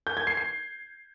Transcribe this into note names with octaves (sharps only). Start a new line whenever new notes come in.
G6
G#6
C7
C7